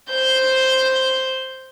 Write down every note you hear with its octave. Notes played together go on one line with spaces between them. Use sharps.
C5 G6